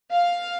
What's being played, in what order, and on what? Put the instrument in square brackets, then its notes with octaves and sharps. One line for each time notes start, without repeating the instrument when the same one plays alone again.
[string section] F5